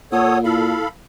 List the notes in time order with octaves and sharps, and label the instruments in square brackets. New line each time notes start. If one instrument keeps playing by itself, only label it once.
[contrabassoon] A#2 [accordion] A4 C#5 D#6 [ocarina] F#5
[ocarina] E4 [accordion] A4 F5 B5